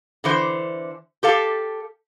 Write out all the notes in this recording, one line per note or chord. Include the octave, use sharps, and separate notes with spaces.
D3 E3 C5
G4 A4 F5